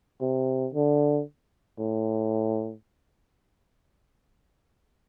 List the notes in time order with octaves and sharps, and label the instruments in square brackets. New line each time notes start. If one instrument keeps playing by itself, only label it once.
[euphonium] C3
D3
A2